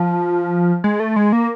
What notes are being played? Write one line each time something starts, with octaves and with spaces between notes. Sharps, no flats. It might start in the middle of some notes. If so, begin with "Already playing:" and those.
Already playing: F3
G#3
A3
G#3
A#3